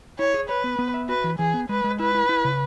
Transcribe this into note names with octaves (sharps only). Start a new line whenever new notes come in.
E4 C#5
G#4
B4 C#5
B3
B3
E5
F#4 B4
E3
E3 G#4
B3
G#3 B4
G#3
E4 B4
E4
E4
C#3